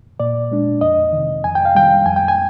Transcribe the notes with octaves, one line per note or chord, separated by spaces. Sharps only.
A#2 D5
G#3 D4
F2 D#5
C3 D#3
F2 G#5
G5
F5
D#3 G3 G5
F2 G#5
G5
G#5